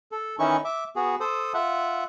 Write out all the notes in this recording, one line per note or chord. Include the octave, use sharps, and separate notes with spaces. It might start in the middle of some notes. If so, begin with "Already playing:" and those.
A4
D#3 E3 C#4 D#4 E4 C#6
E5 D6
B3 F#4 G#4
A4 C5 D#6
F4 E5 F#5